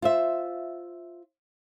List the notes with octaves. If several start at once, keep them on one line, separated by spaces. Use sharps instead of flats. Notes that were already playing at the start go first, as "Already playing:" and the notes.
F4 C5 E5